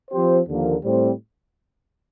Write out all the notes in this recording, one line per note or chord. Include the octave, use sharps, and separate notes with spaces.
F3 C4 G4 C5
D#2 D3 F3 A#3
A2 G3 C4